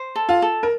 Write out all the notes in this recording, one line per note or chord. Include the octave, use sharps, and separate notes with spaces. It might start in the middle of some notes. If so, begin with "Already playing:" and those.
Already playing: C5
A4
F4
A4
A#4